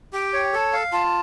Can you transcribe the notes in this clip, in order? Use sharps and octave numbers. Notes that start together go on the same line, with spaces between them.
G4 G5
C#5
A4 A5
F5
F4 A5